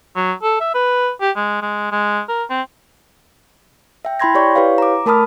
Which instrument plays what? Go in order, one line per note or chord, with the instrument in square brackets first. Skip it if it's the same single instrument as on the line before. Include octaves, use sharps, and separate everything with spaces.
[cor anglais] F#3
A4
E5
B4
G4
G#3
G#3
G#3
A#4
C4
[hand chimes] E5 G5
E4 G5 B5 C6 G#6 A#6
G4 C#5 D5 C#6
E4 G4 B4 C#5 F5
A#5 D6
A3 A#4 A5 B5 D#6 F6